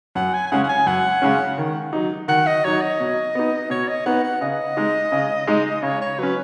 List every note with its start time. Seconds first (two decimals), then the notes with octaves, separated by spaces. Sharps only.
0.15 F#2 F#5
0.34 G#5
0.46 G#5
0.51 C#3 G#3 C#4 F#5
0.64 F#5
0.69 G#5
0.86 F#2 F#5
1.22 C#3 G#3 C#4
1.58 D#3
1.93 F#3 D#4
2.28 D#3 F#5
2.46 D#5
2.64 F#3 D#4 C#5
2.81 D#5
3.00 B2
3.35 B3 D#4
3.70 B2 C#5
3.88 D#5
4.06 B3 D#4 F#5
4.24 F#5
4.41 C#3 D#5
4.77 G#3 D#4
5.12 C#3
5.47 G#3 D#4
5.83 C#3 C#5
6.01 C#5
6.18 F#3 C#4 B4